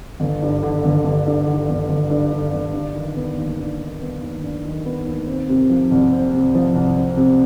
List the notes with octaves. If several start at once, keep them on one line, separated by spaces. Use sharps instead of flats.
G1
G2
D3
G1
G1
G2
D3
G1
G1
G2
D3
G1
D4
D#3
B3
D#2
D4
D#3
B3
D#2
D4
D#3
B3
D#2
C4
C3
F3
C2
C4
C3
F3
C2
C4
C3